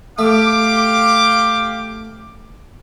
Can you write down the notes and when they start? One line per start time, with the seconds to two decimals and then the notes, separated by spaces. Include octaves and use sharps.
0.19 A3 G4 F5 D6